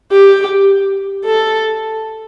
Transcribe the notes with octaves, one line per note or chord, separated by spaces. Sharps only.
G4
A4